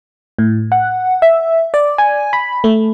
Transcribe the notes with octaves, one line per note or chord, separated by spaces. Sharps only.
A2
F#5
E5
D5
G#5
B5
A3